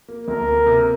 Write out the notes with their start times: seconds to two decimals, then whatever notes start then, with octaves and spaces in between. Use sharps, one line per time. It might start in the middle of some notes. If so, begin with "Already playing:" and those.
0.08 A#3
0.27 D2 A#4
0.48 A#3
0.66 C3